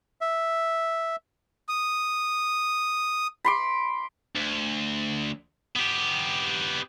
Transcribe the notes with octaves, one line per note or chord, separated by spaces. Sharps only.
E5
D#6
B5 C6 D6
D2
B3 G4